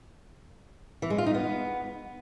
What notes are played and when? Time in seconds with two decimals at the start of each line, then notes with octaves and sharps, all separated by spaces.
1.02 E3
1.10 G#3
1.18 F4
1.26 D#4
1.34 B3